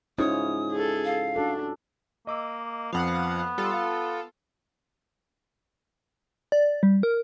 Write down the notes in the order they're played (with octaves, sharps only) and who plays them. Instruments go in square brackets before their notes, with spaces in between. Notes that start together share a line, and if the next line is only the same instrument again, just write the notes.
[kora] G#2 C#5 [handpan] C#4 E4 F4 [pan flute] D#6
[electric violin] G#4 A4
[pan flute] F5
[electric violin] D4 [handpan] F#4 A4
[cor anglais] A#3 [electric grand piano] D#5 D6 E6
[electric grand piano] F2 F3 [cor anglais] B3 [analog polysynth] F5 F#5
[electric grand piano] G3 [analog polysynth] F4 A4
[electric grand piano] F5
[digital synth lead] D5
G3
A#4